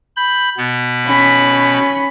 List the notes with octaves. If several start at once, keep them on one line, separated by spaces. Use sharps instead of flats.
B5 G6
B2 B3
C#4 B5